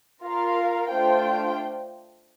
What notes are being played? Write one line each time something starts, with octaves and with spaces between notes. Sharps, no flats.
F4 A#4 F5
A3 D4 F4 C5 G5